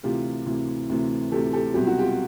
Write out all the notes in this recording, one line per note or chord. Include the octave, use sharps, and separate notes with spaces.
D2 C3 E3 F4 G4
D2 C3 E3
D2 C3 E3
D2 C3 E3 G4 A4
G4 A4
C2 B2 F#3 G4
F#4
F4 G4